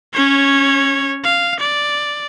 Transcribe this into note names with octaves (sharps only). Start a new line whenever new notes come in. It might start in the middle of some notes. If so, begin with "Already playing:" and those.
C#4 C#5
F5
D5